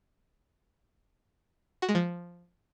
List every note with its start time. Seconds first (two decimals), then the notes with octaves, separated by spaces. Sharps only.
1.82 F#4
1.89 G#3
1.95 F3